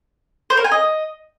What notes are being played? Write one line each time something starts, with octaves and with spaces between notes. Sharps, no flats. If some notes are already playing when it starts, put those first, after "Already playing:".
C5
A#4
G#5
D#5